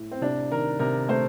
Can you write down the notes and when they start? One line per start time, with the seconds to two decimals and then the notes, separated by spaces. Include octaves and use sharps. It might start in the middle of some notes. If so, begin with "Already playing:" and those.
Already playing: A2
0.12 C4
0.22 C3 D4
0.51 D#3 A#4
0.79 C3 A#4
1.08 A3 C5